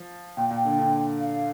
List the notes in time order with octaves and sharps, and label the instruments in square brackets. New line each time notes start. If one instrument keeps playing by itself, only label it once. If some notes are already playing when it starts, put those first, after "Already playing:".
Already playing: [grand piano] F3
[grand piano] A#2 [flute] G5
[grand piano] A#2
[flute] G5
[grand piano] D3
D3
[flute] F5